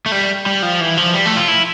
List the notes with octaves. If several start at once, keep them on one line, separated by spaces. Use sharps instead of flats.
A3
G3
G3
F3
E3
F3
G3
A3
F4
E4